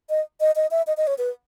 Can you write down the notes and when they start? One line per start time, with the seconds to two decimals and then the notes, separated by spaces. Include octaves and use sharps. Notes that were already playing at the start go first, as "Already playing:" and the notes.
0.10 D#5
0.40 D#5
0.56 D#5
0.71 E5
0.87 D#5
0.97 D#5
1.07 C#5
1.18 B4